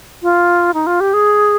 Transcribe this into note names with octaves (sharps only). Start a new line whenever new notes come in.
F4
D#4
F4
G4
G#4